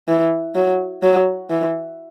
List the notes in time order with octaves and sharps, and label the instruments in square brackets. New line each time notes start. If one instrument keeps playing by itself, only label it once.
[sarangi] E3
F#3
F#3
E3